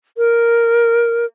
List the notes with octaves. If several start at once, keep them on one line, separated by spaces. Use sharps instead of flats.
A#4